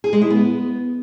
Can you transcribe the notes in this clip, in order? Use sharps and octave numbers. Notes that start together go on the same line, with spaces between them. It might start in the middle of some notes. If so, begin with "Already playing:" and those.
G#4
G#3
E4
B3